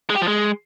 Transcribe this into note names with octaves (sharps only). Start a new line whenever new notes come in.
G#3
G4
F3
G#3